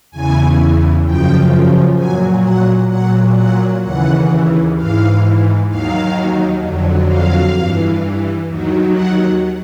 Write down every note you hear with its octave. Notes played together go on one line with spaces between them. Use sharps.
E2 C#3 E3 G#5
F#2 C#3 F3 G5
A#2 F#3 G#5
F#5
A#2 F#3 F#5
F#5
D#2 C#3 E3 F#5
G#2 E3 F5
D#2 D#3 F#3 F5
F2 D3 F#3
F5
G2 E3
D#2 D#3 F#3
F#5